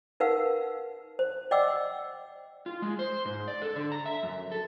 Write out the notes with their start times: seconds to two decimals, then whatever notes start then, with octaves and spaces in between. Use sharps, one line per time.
0.20 D#4 A#4 B4 F5 F#5 E6
1.19 C5
1.51 D5 D#5 F#5 G5 D6 E6
2.66 F4
2.82 G#3
2.99 C5
3.25 G#2
3.48 D5
3.62 A4
3.76 D3
3.92 A#5
4.06 E5
4.23 F#2
4.52 A4